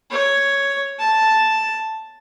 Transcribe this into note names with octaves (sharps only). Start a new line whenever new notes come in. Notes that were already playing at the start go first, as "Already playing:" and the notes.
C#5
A5